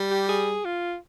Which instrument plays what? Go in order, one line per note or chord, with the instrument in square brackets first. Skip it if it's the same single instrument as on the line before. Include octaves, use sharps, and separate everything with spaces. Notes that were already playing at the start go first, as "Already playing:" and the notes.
Already playing: [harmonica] G3
[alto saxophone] G4
G#4
F4